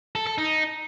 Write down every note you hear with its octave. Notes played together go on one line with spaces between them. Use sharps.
A4
A4
D#4